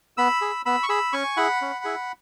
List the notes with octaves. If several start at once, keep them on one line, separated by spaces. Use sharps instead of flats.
B3 B5 E6
G#4
B3 B5 E6
C#6
G#4 B5 E6
C#4 G#5 C#6
E4 G#4 F#5 B5
C#4
E4 G#4